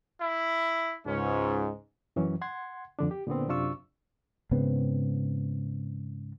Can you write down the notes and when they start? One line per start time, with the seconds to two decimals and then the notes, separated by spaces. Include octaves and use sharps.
0.21 E4
1.07 C#2 G#2 C#4
2.16 F#2 E3 F#3 C#4
2.41 F#5 C6 G#6
2.99 F2 D3 D4
3.11 G4
3.27 A#2 D3 B3 C4
3.49 F#2 C3 D4 F4 C#6 E6
4.51 G#2 C#3 B3 C4